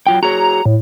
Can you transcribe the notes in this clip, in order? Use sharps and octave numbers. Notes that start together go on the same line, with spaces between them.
F#3 F4 G5
F#4 G#4 C#5 A#5
A2